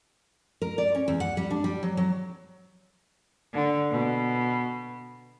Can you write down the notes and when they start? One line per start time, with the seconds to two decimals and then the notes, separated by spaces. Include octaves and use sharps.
0.62 A#4
0.78 D5
0.95 C#4
1.08 E2
1.20 F#5
1.37 G3
1.51 D4
1.64 G3
1.83 F#3
1.97 F#3
3.54 D3
3.91 B2